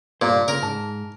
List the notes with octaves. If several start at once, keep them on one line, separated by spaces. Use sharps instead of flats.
G2 A#2 C5
C#3 A#4
G#2 A5